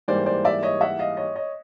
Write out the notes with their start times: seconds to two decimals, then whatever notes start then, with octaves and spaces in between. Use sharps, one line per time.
0.08 G#2 E3 G3 A#3 C5 D5
0.26 C5 D5
0.45 D5 E5
0.63 C#5 D#5
0.81 E5 F#5
0.99 D#5 F5
1.17 C#5 D#5
1.36 C#5 D#5